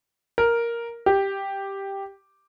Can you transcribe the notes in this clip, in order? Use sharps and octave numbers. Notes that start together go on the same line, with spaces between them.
A#4
G4